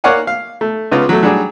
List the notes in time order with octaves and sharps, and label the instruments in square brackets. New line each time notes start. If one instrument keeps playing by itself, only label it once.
[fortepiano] A#3 C#5 D5 F5 F#5 G#5
F5
A3
C#2 C#3 B3 F4
F#3 A3
F#3 G3 D4 G#4